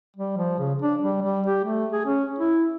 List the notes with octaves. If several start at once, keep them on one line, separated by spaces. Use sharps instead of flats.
G3
F3
C#3
D4
G3
G3
G4
A3
G#4
C#4
E4